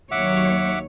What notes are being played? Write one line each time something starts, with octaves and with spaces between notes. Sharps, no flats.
D#2 F#3 C#5 E5 F#5 D6